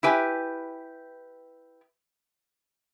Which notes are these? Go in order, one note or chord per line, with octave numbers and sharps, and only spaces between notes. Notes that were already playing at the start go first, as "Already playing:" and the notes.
E4 G4 B4 G#5